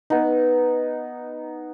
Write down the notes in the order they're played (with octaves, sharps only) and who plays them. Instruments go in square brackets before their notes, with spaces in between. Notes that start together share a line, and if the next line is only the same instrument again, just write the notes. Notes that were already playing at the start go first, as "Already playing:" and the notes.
[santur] B3 D#4